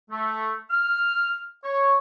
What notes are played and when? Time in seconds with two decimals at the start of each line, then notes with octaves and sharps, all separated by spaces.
0.10 A3
0.70 F6
1.63 C#5